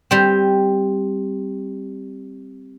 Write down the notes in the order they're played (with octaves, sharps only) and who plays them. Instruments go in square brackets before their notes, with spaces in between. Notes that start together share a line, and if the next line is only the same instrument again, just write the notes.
[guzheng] G3 C4